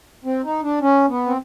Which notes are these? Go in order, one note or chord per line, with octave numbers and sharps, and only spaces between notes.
C4
D#4
D4
C#4
B3
C4